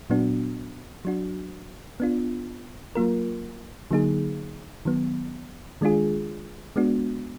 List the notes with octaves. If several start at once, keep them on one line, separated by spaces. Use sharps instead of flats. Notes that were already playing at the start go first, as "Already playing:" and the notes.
A#2 F#3 B3 D4 F#4
F#3 D4 F#4
B3 D4 F4
F#3 A#3 F4 A#4
D3 F#3 A#3 D#4 G#4
D#3 F#3 B3
D#3 G#3 D4 F4 G#4
G#3 B3 D4 F#4